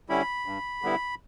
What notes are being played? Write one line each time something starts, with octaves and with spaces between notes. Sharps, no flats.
D3 G3 C#4 E4 B5
G2
D3 G3 B3 E4